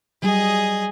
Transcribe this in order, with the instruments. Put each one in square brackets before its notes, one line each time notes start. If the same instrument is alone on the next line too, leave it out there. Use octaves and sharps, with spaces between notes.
[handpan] F#3 G3 G4 [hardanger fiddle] G#4 D#5